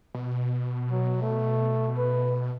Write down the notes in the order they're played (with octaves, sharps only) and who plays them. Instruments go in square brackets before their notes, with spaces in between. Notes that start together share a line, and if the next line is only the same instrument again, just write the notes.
[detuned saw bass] B2
[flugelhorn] F#3
A3
B4